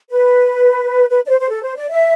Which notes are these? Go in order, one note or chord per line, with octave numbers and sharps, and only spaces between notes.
B4
B4
D5
C5
C5
A4
C5
D5
E5